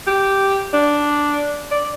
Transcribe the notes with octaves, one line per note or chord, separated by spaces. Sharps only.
G4
D4
D5